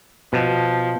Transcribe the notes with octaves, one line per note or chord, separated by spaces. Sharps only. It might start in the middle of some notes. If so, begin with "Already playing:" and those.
B2 F3